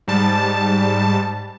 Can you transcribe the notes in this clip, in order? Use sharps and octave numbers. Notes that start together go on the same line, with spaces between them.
G#2 G3 A5